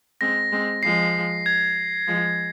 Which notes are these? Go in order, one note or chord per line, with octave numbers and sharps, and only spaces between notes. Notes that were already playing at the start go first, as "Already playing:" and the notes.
G#3 C4 A#6
G#3 C4
F3 G#3 C7
G#6
F3 G#3